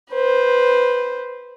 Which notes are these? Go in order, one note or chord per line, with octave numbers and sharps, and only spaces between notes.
B4 C5